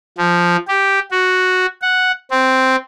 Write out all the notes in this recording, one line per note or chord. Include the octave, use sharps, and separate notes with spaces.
F3
G4
F#4
F#5
C4